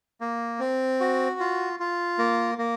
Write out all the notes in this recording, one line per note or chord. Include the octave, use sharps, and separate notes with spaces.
A#3
C4
F#4
F4
F4
A#3
A#3